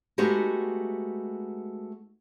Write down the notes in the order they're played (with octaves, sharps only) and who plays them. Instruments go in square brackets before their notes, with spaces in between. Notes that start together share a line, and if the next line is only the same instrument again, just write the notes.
[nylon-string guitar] G#3 A3 B3 D#4 F#4 G4